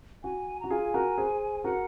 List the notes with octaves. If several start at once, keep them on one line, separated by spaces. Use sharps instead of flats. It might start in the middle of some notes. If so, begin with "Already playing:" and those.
F#4 G#5
F#4 A#5
F4 G#4 G#5
F#4 A#4
G#4 C5
F#4 A#4 F#5